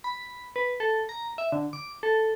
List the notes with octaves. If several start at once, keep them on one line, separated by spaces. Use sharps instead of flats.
B5
B4
A4
A#5
E5
D3
D6
A4